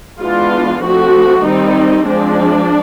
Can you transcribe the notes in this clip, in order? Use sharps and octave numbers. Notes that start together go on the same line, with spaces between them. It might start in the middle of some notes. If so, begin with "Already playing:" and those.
E3 G#3 B3 D4 F4
F3 A3 C4 F#4
D#3 G3 C4 D#4
F3 G#3 C4 D4